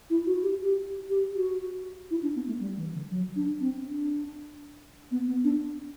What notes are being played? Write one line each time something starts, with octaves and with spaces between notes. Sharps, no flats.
E4
F#4
G4
G4
G4
F#4
E4
D4
B3
A3
G3
E3
D3
F#3
D4
C4
D4
B3
B3
D4